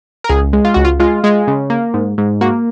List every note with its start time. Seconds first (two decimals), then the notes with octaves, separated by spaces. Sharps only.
0.24 A#4
0.29 C#2 G#4
0.53 G#3
0.65 F4
0.74 C#2 F#4
0.85 F4
1.00 G#3 F4
1.24 G#3
1.48 C#3
1.70 A#3
1.94 G#2
2.18 G#2
2.41 A#3 F#4